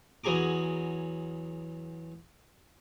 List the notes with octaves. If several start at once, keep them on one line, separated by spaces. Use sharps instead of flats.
E2 F#3 G#4 A#5 D6